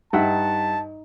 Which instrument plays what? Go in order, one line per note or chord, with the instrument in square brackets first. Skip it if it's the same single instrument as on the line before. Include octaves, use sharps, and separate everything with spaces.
[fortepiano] G2 E5 F#5 [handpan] D#4 [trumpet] A5